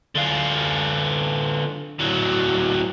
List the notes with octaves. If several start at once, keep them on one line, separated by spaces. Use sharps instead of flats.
D3 F4
A2 F#3